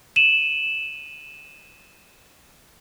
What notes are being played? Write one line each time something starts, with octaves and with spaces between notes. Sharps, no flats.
D#7 E7 F#7